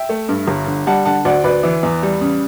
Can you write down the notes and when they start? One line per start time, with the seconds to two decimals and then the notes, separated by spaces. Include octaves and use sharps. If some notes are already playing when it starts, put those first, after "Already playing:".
Already playing: E5 G5
0.09 A3
0.29 G2
0.47 G1
0.67 D3
0.87 G3 F#5 A5
1.05 D3 F#5 A5
1.25 D2 D5 F#5
1.44 D2 B4 D5
1.63 E3
1.83 E2
2.03 G3
2.21 C#3